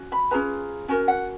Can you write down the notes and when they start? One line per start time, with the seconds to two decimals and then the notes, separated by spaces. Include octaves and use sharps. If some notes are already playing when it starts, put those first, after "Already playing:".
Already playing: C#4 F#4
0.12 B5
0.31 C#4 F4 G#4 B4 A#5
0.88 C#4 F#4 A#4 G#5
1.08 F#5